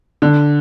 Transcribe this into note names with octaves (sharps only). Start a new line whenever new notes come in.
D3